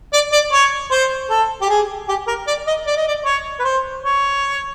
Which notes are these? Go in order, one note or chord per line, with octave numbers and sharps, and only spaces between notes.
D5
D5
C#5
C5
A4
G4
G#4
G4
A#4
D5
D#5
D5
D#5
D5
C#5
B4
C5
C#5